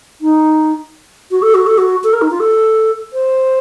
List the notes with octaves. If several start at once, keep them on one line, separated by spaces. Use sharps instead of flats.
D#4
F#4
A4
F#4
A4
F#4
A4
A#4
D#4
F4
A4
C5